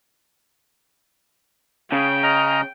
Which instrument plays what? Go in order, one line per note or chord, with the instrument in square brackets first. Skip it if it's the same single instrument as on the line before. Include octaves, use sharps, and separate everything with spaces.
[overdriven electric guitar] C#3 [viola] G5
[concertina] D#5 A#5 F6